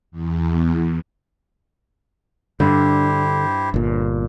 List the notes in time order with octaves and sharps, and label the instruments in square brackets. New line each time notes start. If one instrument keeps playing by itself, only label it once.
[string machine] E2
[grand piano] G2 [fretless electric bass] D3 [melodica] E4 G4 C5
[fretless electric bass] G1 A#2